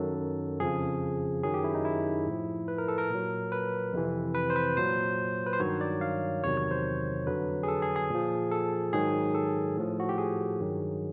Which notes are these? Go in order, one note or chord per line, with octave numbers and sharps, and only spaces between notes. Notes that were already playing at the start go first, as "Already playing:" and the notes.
Already playing: F#2 D#3 F#3 A4
F2 C#3 F3 G#4
F#2 D#3 F#3 G#4
G4
E4
D#4
E4
A2 F3
B4
A#4
A4
A#4
A#2 F#3
B4
F2 C3 E3
B4
C5
B4
A#2 F#3 C5
B4
C5
G2 D#3 F#3 C#5
D5
F5
E2 C3 D#3 F#3 C#5
C#5
C5
F2 D3 F#3 B4
G#4
A4
G#4
G#4
A#2 F3
A4
G#2 D#3 F#3 G#4
A4
A2 F3
F#4
G4
G#4
G2 D#3 F#3